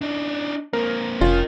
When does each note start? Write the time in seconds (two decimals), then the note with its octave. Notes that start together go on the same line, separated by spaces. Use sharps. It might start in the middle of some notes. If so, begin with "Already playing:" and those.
0.01 D4 D#4
0.73 A#3 C4 A#4
1.21 F1 C#4 F4 A#4 D#5